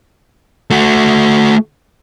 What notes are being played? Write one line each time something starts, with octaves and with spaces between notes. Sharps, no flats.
A3 F#4